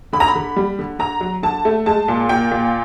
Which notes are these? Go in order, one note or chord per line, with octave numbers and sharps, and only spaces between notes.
D3 B5
A#5
B5
D3
G3
D3
D3 A#5
F#3
D3 A5
A3
G#3 A5
A#2
A#2 G5
A#2